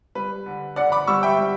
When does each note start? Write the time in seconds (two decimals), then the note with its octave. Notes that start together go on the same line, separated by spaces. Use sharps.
0.15 G3 B4
0.46 D3
0.76 D3 D5 F#5
0.92 B5 D6
1.07 G3 C#6 E6
1.23 E5 G5
1.38 G3